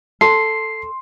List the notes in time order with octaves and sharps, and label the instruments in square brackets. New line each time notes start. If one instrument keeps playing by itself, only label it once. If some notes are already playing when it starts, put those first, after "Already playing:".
[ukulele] A4 [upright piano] C6 [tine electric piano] C7